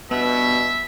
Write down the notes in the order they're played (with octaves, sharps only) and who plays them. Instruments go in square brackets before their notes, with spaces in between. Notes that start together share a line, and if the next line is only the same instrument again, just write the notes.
[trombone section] G2 B2 [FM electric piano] B3 [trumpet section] E5